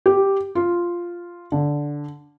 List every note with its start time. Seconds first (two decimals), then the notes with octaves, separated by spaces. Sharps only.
0.06 G4
0.55 F4
1.52 D3